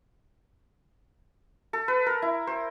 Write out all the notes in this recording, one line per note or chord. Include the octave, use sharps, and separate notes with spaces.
A4
B4
A#4
E4
C5